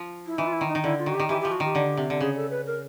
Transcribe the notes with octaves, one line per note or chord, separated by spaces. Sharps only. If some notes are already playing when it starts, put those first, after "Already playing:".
Already playing: F3
E4
E3 D#4
F4
E4
D#3
D#4
D#3
D3 E4
F4
D#3 F#4
G4
D#3
E3 G4
G4
F3
F#4
D#3 G4
D3
C3
D3
C#3 G#4
A4
B4
A#4